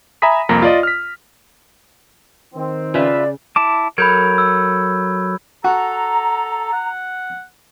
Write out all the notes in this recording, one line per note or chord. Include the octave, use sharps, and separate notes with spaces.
E5 G#5 A#5 B5 D#6 B6
C2 F2 A#3 A#5 B5 A#6
F4 D5 D#5
F6 B6
D#3 C4
C#3 F4 B4 D5 E5
E4 A5 D6
F#3 A4 A#4 B5 G6 G#6
E6
F#4 A4 A#5
F#5